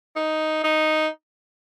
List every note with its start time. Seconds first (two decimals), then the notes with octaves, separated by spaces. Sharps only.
0.16 D#4
0.64 D#4